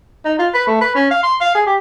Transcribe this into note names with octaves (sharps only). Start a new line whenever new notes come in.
D#4
F4
B4
A3
B4
C#4
F5
C6
F5
G#4
G4